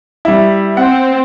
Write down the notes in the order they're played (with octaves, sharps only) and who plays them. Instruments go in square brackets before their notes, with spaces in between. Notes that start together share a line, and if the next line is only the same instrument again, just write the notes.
[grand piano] G3 E4
[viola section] C4 [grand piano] F#5